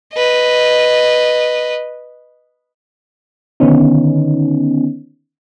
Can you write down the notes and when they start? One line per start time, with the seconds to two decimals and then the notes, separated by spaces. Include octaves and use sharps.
0.14 B4 D#5
3.60 D3 D#3 B3 C#4 D#4